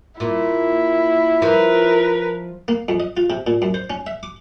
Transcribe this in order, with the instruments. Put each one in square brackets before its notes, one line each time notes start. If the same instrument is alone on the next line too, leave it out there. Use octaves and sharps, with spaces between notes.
[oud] A#2 [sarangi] E4
[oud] F3 [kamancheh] A#4 B4
[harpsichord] A#3
F2
D#5
F4
C3
A#2
F#2
C5
C#4
E5
D6